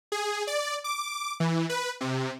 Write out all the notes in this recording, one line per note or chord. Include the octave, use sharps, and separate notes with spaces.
G#4
D5
D6
E3
B4
C3